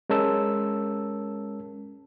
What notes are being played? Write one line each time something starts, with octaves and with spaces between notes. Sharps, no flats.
G#3 C#4 A#4 A5 E6